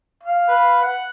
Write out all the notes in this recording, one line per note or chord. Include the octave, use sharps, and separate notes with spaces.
F5
B4
F#5